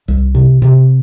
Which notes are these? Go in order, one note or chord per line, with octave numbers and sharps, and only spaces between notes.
C2
C3
C3